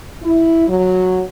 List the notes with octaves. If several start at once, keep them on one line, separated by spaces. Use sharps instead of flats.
E4
F#3